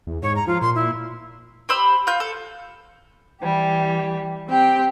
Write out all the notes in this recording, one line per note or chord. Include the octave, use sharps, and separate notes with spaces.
E2
G#2 C#5
A#5
F3 F4
A#2 C6
E4
G4 C5 B5 E6
F4 G6
A4
E3 G3 G4
C4 G4 G5